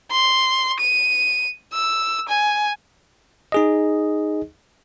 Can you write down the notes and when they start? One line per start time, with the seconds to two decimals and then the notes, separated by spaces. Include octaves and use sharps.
0.10 C6
0.80 D#7
1.73 E6
2.28 G#5
3.52 D#4 G#4 D#5